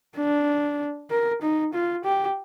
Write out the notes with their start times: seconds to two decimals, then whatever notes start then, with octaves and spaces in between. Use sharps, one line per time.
0.17 D4
1.10 A#4
1.42 D#4
1.73 F4
2.05 G4